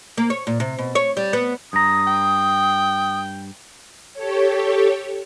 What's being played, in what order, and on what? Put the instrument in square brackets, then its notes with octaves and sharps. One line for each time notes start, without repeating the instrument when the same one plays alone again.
[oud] A#3
C#5
A#2
C3
B2
C#5
G3
B3
[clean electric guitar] G2 A#5 [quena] D#6
[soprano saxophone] G5
[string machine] G4 A4 C#5